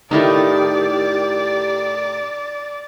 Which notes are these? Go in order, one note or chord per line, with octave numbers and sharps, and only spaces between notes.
A2 D#3 A3 D#4 E4 G4 D5